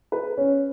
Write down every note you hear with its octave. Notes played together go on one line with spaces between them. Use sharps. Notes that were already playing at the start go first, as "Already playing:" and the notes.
B4
C#4